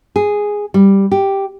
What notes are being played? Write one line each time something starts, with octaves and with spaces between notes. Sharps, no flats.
G#4
G3
G4